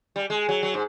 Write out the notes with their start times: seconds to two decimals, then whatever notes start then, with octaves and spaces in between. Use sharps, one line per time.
0.16 G3
0.30 G#3
0.49 F#3
0.63 F#3
0.74 G#2